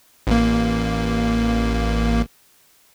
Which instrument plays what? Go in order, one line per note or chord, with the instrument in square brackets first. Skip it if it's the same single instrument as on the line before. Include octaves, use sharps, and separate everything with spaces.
[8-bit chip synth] A1 A#3